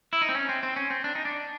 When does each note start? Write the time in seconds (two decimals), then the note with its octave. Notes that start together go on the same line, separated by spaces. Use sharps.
0.13 E4
0.21 D#4
0.29 C4
0.35 C#4
0.49 C4
0.63 C4
0.76 C#4
0.91 C4
1.04 D4
1.15 D#4
1.25 D4